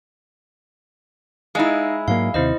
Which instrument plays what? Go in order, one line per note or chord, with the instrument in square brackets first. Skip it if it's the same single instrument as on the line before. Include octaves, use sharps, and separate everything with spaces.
[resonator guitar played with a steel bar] G#3 E4 [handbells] D#4 D#5 F5
[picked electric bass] G#2 F#3 A#3 [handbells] F5
[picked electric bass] D#2 C3 [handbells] E4 C5 D#5